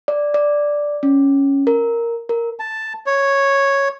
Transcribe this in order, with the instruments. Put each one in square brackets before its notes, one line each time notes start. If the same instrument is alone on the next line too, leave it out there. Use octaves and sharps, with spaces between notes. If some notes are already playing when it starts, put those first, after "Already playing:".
[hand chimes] D5
D5
C#4
A#4
A#4
[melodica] A5
C#5